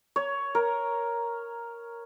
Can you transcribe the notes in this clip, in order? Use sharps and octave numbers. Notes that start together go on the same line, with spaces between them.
C#5
A#4